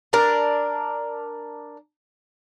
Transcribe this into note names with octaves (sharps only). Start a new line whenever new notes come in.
D4 A#4